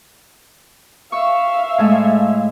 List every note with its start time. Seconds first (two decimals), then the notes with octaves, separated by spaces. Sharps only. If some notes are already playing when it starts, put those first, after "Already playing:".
1.12 E5 F5 C#6 E6
1.78 A2 G#3 A3